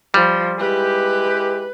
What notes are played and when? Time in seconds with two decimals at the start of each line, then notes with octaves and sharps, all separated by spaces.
0.14 F3 G3
0.59 G#3 E4 G4 B4